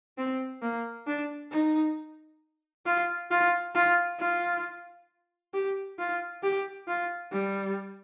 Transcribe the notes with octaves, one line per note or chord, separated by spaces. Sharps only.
C4
A#3
D4
D#4
F4
F4
F4
F4
G4
F4
G4
F4
G3